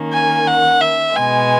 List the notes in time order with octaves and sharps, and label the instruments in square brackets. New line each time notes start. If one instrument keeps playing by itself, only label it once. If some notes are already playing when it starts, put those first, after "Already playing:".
Already playing: [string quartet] D#3 A#3 C#4
[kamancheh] G#5
F#5
E5
[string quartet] B2 G#3 B3 [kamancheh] G#5